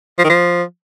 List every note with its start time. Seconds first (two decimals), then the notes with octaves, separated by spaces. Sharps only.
0.19 F3
0.24 D#3
0.30 F3